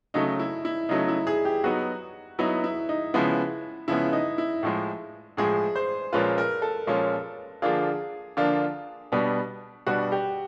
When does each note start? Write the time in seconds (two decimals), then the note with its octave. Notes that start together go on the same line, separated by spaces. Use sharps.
0.14 C#3 F#3 A3 D#4
0.39 E4
0.65 E4
0.89 C#3 F#3 A3 D#4
1.08 E4
1.27 G#4
1.45 G4
1.64 F#3 B3 D#4 F#4
2.39 F#3 B3 D#4 E4
2.64 E4
2.89 D#4
3.14 C#3 F3 G#3 B3 E4
3.88 C#3 F3 G#3 B3 E4
4.13 D#4
4.38 E4
4.63 A2 F3 G#3
5.37 A2 F3 G#3 G#4
5.76 C5
6.13 A#2 F3 G#3 C#4 F4 B4
6.38 A#4
6.62 A4
6.87 A#2 F3 G#3 C#4 F4
7.62 D3 F3 A#3 D4 F4 G#4
8.37 D3 F3 A#3 D4 F4
9.12 B2 G3 B3 D4
9.87 B2 G3 B3 D4 F#4
10.12 G4